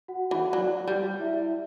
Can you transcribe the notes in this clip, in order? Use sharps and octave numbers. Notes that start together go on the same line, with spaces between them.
F#4 F#5
E3 F#4 F#5
F#3 D5
G3
E4 E5